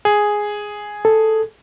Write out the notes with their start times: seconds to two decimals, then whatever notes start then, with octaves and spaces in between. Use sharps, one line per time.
0.05 G#4
1.05 A4